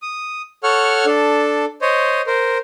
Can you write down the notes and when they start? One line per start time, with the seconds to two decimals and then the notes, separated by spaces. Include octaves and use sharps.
0.02 D#6
0.64 A4 C#5 F#5 C#6 F6
1.06 D4 A4
1.82 C5 C#5 D#5
2.27 A#4 C5